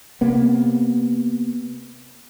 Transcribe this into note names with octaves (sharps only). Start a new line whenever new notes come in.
C3 A#3 B3